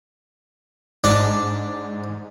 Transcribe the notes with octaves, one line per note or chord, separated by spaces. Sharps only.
G#2 D4